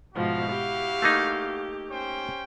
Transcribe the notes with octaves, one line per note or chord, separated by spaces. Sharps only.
G#2 B2 F3 E4 F#4 F5
G4
A3 A#3 D#4
C#4 C5 G5